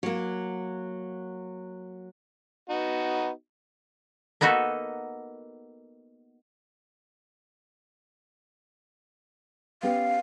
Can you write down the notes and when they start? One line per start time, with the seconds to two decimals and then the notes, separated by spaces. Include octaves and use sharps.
0.03 F#3 A#3
2.70 B3 D#4 F#4
4.41 A#3 B3 D#4 F#4 A4
9.83 B3 C#4 G4 F5